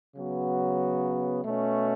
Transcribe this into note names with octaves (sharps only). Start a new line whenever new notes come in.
C#3 F#3 B3 F#4
B2 A3 C#4